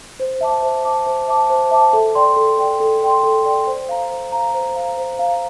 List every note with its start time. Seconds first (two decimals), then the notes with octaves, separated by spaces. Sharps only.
0.20 C5
0.41 E5 A5 D6
0.63 C5
0.85 E5 A5 D6
1.06 C5
1.28 E5 A5 D6
1.50 C5
1.71 E5 A5 D6
1.93 A4
2.15 D5 G5 C6
2.36 A4
2.59 D5 G5 C6
2.80 A4
3.02 D5 G5 C6
3.24 A4
3.45 D5 G5 C6
3.67 C5
3.89 F5 A#5
4.10 C5
4.32 F5 A#5
4.54 C5
4.76 F5 A#5
4.98 C5
5.19 F5 A#5